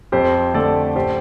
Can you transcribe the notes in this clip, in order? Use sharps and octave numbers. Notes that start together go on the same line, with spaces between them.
F2 G4 C5
D3 A3 A4 D5
A1 G4 C5